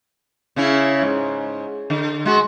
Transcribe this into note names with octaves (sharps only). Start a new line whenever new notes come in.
C#3 C#4 E4
G#2
D3
G#3 F#4